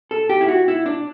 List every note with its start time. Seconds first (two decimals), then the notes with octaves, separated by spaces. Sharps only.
0.11 A4
0.30 G4
0.41 E4
0.48 F#4
0.68 E4
0.86 D4